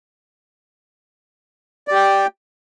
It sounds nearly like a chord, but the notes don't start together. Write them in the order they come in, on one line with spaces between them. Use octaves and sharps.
D5 G4 G5